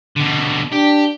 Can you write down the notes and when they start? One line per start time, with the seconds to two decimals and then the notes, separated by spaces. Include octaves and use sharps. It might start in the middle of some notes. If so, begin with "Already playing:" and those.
0.16 B2 D3
0.72 D4 G4